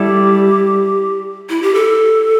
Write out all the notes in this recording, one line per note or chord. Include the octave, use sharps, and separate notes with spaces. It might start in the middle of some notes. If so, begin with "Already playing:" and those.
Already playing: G3 E4 G4 A4 D5
E4
G4
A4